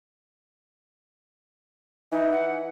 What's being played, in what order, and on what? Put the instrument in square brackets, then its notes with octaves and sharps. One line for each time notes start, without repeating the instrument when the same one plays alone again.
[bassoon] E3 [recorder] D#4
[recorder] F#5